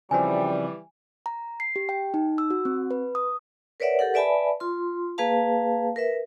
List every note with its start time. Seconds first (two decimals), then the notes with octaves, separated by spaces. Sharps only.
0.11 C#3 E3 F3 G3 C4 D5 G#5
1.26 A#5
1.60 C7
1.76 G4
1.89 G5
2.14 D#4
2.38 E6
2.50 F#4
2.65 C4
2.91 B4
3.15 D#6
3.80 A#4 B4 C#5 D5 E5 F#5
3.99 G4 A4 A#4 F#5
4.14 B4 D5 E5 G#5 A5 B5
4.60 F4 C6
5.18 A#3 G#4 B4 F5 A5
5.96 A#4 B4 E5